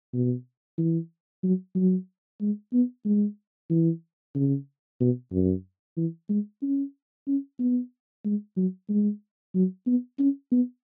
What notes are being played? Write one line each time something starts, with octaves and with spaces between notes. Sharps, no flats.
B2
E3
F#3
F#3
G#3
B3
G#3
E3
C#3
B2
F#2
E3
G#3
C#4
C#4
B3
G#3
F#3
G#3
F#3
B3
C#4
B3